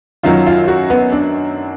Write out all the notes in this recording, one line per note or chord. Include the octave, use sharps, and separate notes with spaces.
F#2 D#3 F#3 F4
F4
F#4
B3
D4